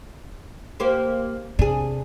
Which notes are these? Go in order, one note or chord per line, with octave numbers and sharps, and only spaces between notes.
A#3 G4 C5
C3 D4 G#4